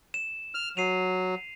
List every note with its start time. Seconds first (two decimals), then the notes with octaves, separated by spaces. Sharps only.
0.14 E7
0.55 F6
0.77 F#3 C7 D#7 F7